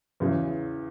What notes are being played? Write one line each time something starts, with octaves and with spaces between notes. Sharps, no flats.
E2 C#3 E3